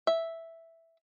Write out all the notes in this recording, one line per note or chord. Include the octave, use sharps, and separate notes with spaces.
E5